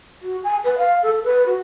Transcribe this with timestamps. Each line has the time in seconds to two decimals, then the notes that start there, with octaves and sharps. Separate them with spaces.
0.22 F#4
0.44 G#5
0.64 B4
0.78 F5
1.03 A4
1.24 B4
1.46 F#4